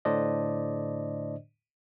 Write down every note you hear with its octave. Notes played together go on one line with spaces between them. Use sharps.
A2 D3 D4 C5 D5 D#5